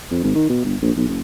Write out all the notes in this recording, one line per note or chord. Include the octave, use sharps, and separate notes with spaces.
F2
G#1
D#3
B2
G1
A#1
B1
F#1